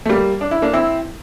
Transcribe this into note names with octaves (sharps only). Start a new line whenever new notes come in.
A3
G3 A#3
D4
E4
A#3 D4
C4 E4